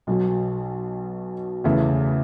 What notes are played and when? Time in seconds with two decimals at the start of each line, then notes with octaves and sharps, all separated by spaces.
0.07 B1 B2 F#3
1.64 E2 C#3 E3 A3